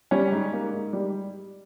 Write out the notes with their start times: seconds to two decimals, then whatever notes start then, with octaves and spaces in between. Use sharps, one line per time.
0.11 G3 C#4
0.32 G#2
0.53 A#3
0.73 G#2
0.93 G3